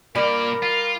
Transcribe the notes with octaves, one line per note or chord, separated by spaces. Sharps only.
A#2 G3 A#4 D5
F4